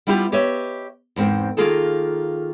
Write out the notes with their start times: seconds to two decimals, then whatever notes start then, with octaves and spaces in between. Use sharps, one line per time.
0.07 G3 B3 E4 F4 G4
0.32 G4 B4 C#5 D#5 E5
1.16 E2 G#2 C4 A#4
1.57 D#3 A#3 F4 G#4 A4